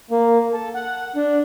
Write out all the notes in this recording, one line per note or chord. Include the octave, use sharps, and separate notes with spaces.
A#3
A4
F#5
D4